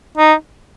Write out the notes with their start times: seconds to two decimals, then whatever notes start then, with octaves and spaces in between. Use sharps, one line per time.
0.17 D#4